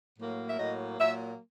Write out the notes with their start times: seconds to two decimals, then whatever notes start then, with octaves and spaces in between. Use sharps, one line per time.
0.18 A2 F#3 A#3
0.49 E5
0.58 A2 F#3 A#3 D#5
0.98 A#2 F#3 A#3 E5